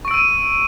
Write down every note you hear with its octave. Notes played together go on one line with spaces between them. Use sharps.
C#6 E6 D7 D#7